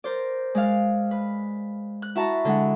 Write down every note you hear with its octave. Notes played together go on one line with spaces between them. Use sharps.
A#4 C5 D5
G#3 D5 F5
B4
F#6
E4 F#4 E5 A5 A#5
D3 G#3 F#5